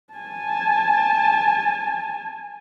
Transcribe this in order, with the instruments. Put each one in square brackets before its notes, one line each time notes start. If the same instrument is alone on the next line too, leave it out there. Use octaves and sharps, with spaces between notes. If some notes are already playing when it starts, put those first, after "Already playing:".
[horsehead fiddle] G#5 A5